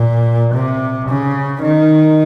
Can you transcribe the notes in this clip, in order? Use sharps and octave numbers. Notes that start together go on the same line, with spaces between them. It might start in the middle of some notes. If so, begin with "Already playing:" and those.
Already playing: A#2
C3
C#3
D#3